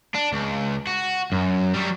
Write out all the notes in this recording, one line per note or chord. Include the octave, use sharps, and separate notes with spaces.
D4
C#2
F#4
F#2
F#3 G3